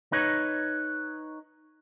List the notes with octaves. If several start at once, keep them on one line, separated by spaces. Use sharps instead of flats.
D#4 B4 C#5